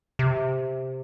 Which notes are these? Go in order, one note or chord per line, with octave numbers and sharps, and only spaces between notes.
C3